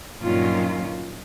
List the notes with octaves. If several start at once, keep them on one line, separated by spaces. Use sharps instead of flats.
G2 A#2 D#3 F#3 C#4 F4